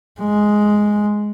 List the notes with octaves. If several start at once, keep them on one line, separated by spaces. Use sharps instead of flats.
G#3